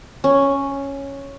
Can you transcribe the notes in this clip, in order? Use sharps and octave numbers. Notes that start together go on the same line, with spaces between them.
C#4